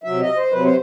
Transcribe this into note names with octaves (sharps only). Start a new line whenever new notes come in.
C3 F#3 E5
D#5
C5
C3 F#3 B4
C5